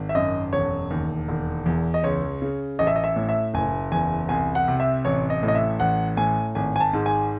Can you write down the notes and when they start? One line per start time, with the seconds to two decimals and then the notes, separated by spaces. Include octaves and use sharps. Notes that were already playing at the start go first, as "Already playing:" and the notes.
Already playing: G#1
0.09 E5
0.15 F#2 D#5
0.53 E1 C#5
0.91 D#2
1.28 E1
1.66 E2
1.94 D#5
2.04 C#2 C#5
2.42 C#3
2.79 A1 D#5
2.87 E5
2.96 D#5
3.04 E5
3.16 A2
3.29 E5
3.54 F#1 G#5
3.92 E2 G#5
4.29 C2 G#5
4.55 F#5
4.68 C3
4.80 E5
5.05 A1 C#5
5.30 D#5
5.43 A2
5.48 D#5
5.55 E5
5.80 A1 F#5
6.17 A2 G#5
6.55 G#1 G#5
6.76 G#5
6.80 A5
6.93 G#2
7.06 G#5